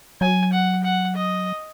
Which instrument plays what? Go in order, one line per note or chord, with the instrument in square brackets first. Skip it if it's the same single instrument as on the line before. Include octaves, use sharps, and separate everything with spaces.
[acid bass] F#3 [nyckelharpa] G#5
[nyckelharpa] F#5
F#5
D#5